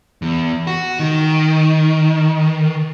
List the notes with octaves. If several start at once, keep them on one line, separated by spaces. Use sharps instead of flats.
E2
F#4
D#3